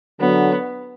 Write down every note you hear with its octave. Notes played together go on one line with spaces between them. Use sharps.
D3 F#3 B3